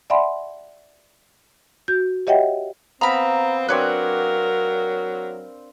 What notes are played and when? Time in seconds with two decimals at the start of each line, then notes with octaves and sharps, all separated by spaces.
0.10 D5 E5 F#5 G#5 B5 C6
1.88 F#4 G6
2.27 G4 C#5 D#5 E5 F#5 G5
3.01 B3 C4 F5 A#5 B5
3.68 F#3 C4 D4 A#4 B4 C#5 D5